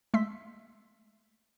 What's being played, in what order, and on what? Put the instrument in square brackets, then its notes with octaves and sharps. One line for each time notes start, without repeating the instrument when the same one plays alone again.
[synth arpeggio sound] G#3 A3 C6 E6 B6